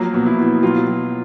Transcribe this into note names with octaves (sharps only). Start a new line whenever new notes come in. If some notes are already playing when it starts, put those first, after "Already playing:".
Already playing: F3 F#3 A#3
B2
E4
B2
F#3 F4
F#3